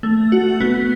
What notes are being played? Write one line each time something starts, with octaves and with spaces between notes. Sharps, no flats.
A3
F#4
B3